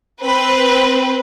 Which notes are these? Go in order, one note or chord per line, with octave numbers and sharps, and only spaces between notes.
C4 B4